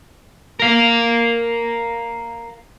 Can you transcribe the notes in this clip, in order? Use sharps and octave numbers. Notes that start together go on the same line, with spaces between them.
A#4 F5